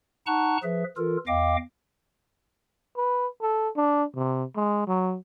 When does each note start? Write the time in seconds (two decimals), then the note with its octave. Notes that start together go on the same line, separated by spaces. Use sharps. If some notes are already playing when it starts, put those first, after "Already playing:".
0.27 D#4 F#5 A5 A#5 C#6 F#6
0.63 F3 G#4 B4 E5
0.97 E3 F4 A4 A#4
1.27 E2 D#5 F5 G5 D6
2.97 B4
3.42 A4
3.76 D4
4.16 C3
4.56 G#3
4.87 F#3